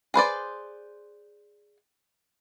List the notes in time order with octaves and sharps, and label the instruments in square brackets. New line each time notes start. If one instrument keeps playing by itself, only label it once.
[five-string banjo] G#4 B4 C5 D5